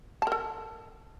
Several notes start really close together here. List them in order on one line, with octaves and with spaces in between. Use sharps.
A5 A#4 A4